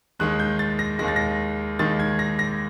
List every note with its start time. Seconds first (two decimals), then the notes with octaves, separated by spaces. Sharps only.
0.19 D#2 D#3 G#3 F#6
0.40 G6
0.59 A6
0.79 A#6
0.99 D#2 D#3 G#3 A#6
1.08 A6
1.16 A#6
1.79 D#2 D#3 G#3 A6
2.00 G#6
2.19 A#6
2.39 A#6